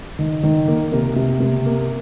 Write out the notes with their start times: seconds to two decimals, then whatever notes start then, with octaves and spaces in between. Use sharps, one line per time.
0.19 D#3
0.43 D#3
0.68 A#3
0.92 C3 A#3 A#4
1.16 C3
1.40 C3
1.66 A#3